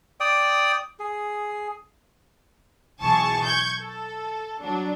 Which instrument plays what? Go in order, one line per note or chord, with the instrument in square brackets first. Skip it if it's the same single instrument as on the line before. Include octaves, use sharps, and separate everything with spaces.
[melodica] D5 G5 D#6
G#4
[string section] B1 E3 G#4 A5 C#6
C#6 G6 G#6
A4
F#3 D4